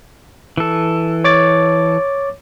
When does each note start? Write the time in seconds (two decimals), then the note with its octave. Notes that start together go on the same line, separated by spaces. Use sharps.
0.57 E3 A4
1.24 C#5 D6 A6